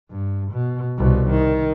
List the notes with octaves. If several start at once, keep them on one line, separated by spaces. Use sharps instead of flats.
G2
B2
C2 B2
D#3